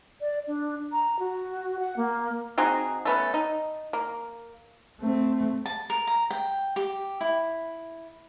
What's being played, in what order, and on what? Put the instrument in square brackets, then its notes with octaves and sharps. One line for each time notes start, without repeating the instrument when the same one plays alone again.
[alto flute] D5
D4
A#5
F#4
F#5
A#3
[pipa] C4 D#4 F#4 G#4
A3 B3 C#4
D#4
A#3
[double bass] A3 C4
[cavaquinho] A5
A#4
A#5
G5
G4
E4